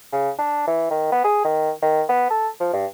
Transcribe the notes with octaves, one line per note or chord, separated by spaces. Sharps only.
C#3
D4
E3
D#3
B3
G#4
D#3
D#3
B3
A4
F3
G2